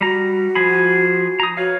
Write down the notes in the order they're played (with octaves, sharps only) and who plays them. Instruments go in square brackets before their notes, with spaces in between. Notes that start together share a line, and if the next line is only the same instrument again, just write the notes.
[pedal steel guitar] G3 A#5 [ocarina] F#4
[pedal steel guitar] F3 G#4 B5
A#5 D#6
[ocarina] F#4 [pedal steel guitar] B4 C#5 F5